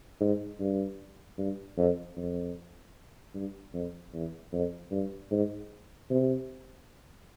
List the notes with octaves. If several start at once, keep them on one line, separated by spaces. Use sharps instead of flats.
G#2
G2
G2
F2
F2
G2
F2
E2
F2
G2
G#2
C3